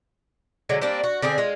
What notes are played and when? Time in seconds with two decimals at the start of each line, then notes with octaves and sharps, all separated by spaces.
0.69 D3 F#3 G#3
0.82 G3 A#3 C4 D4
1.04 F#4
1.22 D3 C4 G4 G#4
1.38 G#3 F4